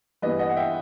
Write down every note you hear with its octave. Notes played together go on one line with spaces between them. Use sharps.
G2 E3 B3 B4 D#5
D#5 F#5
F#5
E5 G5